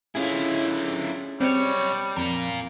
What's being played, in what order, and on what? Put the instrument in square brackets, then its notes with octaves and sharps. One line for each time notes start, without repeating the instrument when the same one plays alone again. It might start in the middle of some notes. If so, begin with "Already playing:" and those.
[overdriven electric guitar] D3 E4 [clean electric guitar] C#4 F4 G#4
[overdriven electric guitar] B1 C#5 [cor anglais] G3 [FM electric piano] C4 D5 C#7
[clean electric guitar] F2 [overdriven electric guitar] F4 A#4